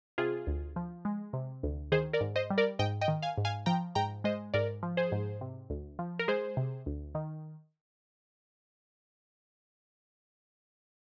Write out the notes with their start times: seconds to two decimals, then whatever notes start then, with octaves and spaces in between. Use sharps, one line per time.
0.18 C3 F4 G#4
0.47 D2
0.76 F3
1.05 G#3
1.33 C3
1.63 D2
1.92 D#3 G#4 C5
2.13 A#4 D5
2.21 G#2
2.36 C5 D#5
2.50 G3
2.58 A#4 D5
2.79 G#2 D#5 G5
3.01 D#5 G5
3.08 D#3
3.22 F5 G#5
3.38 G#2
3.45 F5 G#5
3.66 F3 G5 A#5
3.95 G#2 G5 A#5
4.24 G#3 C5 D#5
4.54 G#2 A#4 D5
4.83 F3
4.97 G#4 C5
5.12 G#2
5.41 C3
5.70 D2
5.99 F3
6.19 A#4
6.28 G#3 G#4 C5
6.57 C3
6.86 D2
7.15 D#3